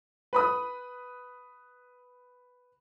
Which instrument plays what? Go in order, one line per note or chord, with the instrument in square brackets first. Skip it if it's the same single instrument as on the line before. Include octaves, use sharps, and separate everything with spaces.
[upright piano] B4 B5 D#6